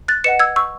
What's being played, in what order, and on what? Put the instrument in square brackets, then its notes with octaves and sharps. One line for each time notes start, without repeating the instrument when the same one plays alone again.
[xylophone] F#6 A6
B4 D#5 F#5 C#7 E7
E6 G#6
C#6 E6